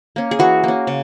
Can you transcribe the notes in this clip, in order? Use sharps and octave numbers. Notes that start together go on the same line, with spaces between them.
A#3 C#4
G#4
E3 F#4
A#3 C#4
C#3